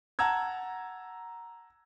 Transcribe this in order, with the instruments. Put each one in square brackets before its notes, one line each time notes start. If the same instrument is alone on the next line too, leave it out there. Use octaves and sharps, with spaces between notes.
[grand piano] F#5 A5 A#5 E6 G#6